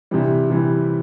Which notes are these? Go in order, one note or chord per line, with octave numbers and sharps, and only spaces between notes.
C3 E3 G3
C3 E3 G3